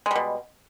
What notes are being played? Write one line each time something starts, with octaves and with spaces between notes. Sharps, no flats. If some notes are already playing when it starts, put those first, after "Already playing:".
B2 G3 G#3